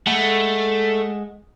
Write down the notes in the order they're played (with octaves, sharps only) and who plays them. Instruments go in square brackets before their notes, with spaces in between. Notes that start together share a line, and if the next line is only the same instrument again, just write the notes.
[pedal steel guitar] G#3 F#5 B5 [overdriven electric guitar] A3